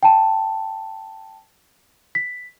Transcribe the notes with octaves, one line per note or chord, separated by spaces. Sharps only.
G5 A5
B6